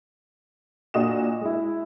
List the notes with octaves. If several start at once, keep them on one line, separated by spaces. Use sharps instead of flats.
A#2 D4 F#4 D#5 D#6 E7
G#3 E4